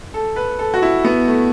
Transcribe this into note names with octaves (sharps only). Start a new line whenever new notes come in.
A4
B4
A4
F#4
E4
B3
A3